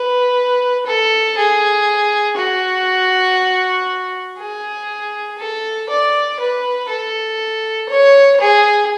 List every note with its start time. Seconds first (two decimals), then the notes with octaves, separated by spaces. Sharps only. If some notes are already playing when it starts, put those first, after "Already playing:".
Already playing: B4
0.86 A4
1.37 G#4
2.37 F#4
4.38 G#4
5.38 A4
5.89 D5
6.40 B4
6.89 A4
7.89 C#5
8.40 G#4